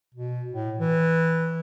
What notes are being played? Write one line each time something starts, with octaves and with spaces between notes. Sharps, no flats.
B2
A2
E3